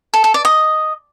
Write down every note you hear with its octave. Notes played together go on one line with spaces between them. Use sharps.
A4
A4
D5
D#5